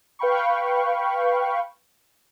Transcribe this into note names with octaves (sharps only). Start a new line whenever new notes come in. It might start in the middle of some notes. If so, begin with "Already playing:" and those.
B4 F5 G5 B5 C#6